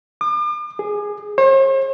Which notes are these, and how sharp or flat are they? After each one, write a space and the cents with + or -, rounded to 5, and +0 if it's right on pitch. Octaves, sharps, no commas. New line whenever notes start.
D6 +40
G#4 +0
C5 +45